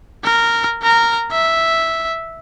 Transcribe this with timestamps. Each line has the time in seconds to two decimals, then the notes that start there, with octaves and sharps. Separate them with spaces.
0.25 A#4
0.83 A#4 A#5
1.32 E5